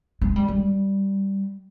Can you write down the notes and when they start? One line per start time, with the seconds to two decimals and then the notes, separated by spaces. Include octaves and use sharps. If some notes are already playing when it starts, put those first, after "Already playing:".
0.22 G#3
0.36 G3
0.48 G3